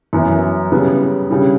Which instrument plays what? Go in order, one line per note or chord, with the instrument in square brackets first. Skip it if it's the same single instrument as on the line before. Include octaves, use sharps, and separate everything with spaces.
[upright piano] F#2 E3 B3
C#3 G3 B3
C#3 G3 D4